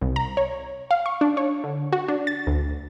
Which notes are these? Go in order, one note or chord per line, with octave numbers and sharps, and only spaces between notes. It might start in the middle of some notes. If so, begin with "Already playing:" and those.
C2
A#5
C#5
F5
C#6
D4
C#5
D3
F#4
D4
A6
D2